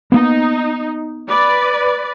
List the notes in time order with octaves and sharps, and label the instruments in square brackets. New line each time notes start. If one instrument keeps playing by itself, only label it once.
[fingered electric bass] A#3 B3 [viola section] D#4
[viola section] B4 D5